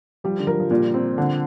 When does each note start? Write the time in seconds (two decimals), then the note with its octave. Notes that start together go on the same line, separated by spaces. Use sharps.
0.24 F3 G3
0.39 D3
0.47 F3 A#4
0.60 F3
0.71 A#2 G3
0.94 C4
1.18 D3